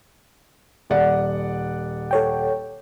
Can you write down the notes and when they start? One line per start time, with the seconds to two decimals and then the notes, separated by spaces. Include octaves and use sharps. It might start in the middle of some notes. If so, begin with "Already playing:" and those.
0.90 D#1 D5 F#5
2.11 A4 C#5 G5